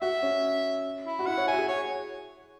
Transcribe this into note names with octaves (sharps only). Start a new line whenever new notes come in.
F#4 E5
C#4
E4
F#4
E4 F#5
C#5
E5 G#5
F#4
G#4
C#5